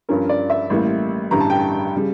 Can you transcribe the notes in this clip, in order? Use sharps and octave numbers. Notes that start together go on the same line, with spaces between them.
G2 F3 C#4 A#4
D5
E5
A1 A2 G3 A#3
A1 G2 D3 G3 A#5
A5
G5
A5
C#3 G3